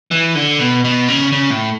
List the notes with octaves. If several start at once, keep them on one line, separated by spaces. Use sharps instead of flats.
E3
D3
B2
B2
C#3
C#3
A2